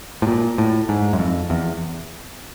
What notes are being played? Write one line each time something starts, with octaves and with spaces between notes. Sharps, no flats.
A2
A#2
A2
G#2
F#2
F2
E2